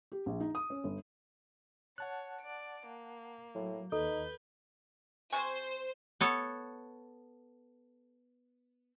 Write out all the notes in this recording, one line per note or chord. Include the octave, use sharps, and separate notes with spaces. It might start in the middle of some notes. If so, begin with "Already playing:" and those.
G4
A#1
D#4
D#6
C#4
G1
C#5 F#5 A5 F#6
D5 D7
A#3
A2 F#3
D#2 D#4 A4 B4 G6
C3 C5 G#5 C#6
B3 A4 C#5